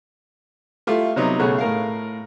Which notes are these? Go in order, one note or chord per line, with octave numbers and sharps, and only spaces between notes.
A3 E4 F4 G4
C3 F#3 B3 D#4
B1 C#3 A3 C#5 F#6
A2 A#4 F5